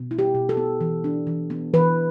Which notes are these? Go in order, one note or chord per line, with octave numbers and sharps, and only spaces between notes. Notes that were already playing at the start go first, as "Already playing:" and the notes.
Already playing: B2
E4
G4
B2
A4
B3
E3
D4
E3
B3
E3 B4